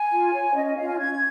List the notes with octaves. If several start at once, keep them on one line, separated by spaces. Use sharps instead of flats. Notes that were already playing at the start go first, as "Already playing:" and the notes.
Already playing: G#5
F4
C#5
C#4 D#5
D#5
F4 C#5 F5
G#5
C#4 G#6